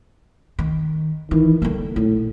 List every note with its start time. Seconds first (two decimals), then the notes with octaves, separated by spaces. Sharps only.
0.59 D#3
1.31 D#3 E3
1.62 D3 G3 A#3
1.96 A#1 A2